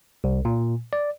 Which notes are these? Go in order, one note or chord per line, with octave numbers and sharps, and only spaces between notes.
C2
A#2
D5